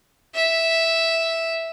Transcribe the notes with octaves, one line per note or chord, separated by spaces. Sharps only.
E5